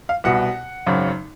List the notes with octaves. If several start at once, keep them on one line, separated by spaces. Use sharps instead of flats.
F5
C2 B2 F#5
G#1 F#2 C#3